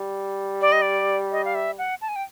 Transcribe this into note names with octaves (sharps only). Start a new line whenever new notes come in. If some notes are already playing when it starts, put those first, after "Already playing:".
Already playing: G3
D5
D#5
D5
D#5
F5
E5
F#5
A5
G#5
G5